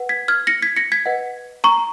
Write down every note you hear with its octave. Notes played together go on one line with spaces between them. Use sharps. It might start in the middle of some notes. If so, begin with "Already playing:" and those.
Already playing: B4 F#5
G#6 B6
F6 G#6
A#6 C#7
G#6 B6
A#6 C#7
G#6 B6
B4 D#5 F#5
A#5 C#6